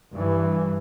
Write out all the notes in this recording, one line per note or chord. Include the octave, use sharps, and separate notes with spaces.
G2 E3